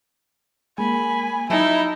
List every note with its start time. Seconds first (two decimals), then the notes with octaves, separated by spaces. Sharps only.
0.78 G#3 A#3 G#5 B5
1.50 F#3 D#4 E4 E5 A5